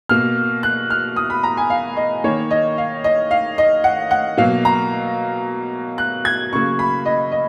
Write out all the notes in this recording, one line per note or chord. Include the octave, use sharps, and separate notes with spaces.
B2 A#3 F6
F#6
F6
D#6
B5
A#5
G#5
F5
D#5
D#3 A#3 C#5
D#5
F5
D#5
F5
D#5
F#5
F#5
B2 F#3 A#3 F5
A#5
F#6
G#6
C#3 F#3 A#3 C#6
B5
D#5
D#5